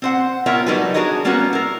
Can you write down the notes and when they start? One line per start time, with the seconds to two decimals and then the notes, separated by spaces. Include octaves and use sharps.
0.02 C4 C5 F#5
0.46 B3 F4 A#4 C#5 E5 G5
0.66 F#3 G3 D#4 F#4 A4 B4
0.94 D4 F#4 G#4 A#4 C#5 D#5
1.24 G3 A#3 B3 C#4 F#4 A#4
1.53 E4 A#4